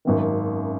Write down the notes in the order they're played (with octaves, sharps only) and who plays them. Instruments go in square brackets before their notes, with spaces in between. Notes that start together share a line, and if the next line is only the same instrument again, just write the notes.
[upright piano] G#1 F#2 D#3